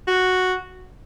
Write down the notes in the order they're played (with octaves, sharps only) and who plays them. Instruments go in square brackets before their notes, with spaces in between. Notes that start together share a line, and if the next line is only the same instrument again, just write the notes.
[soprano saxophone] F#4